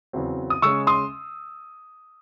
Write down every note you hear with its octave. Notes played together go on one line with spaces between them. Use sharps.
E2 C#3 F#3 C4
D#6
C#3 G#3 C#4 C#6 E6
C6 D#6